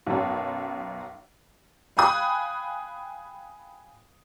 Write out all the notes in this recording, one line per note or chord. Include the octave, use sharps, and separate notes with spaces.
B1 F#2
F5 G5 G#5 B5 D#6 F#6